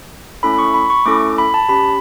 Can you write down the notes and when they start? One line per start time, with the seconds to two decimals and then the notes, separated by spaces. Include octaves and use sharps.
0.43 A3 C#4 E4 A4 B5
0.59 C#6
0.74 B5
0.90 C#6
1.06 A3 C#4 E4 A4 D6
1.38 B5
1.54 A5
1.69 C#4 G4 B5